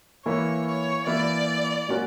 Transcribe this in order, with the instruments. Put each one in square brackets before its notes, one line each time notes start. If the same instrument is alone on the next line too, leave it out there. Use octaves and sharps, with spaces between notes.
[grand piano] E3 A#3 E4 A#4 [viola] C#5
[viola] C#5
[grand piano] E3 A#3 E4 [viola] D5
[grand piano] A#2 F#3 C#4 F#4 A#4